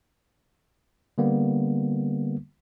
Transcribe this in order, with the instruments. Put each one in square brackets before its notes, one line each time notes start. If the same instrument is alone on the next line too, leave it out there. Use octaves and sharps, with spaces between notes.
[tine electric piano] D3 G3 A#3 B3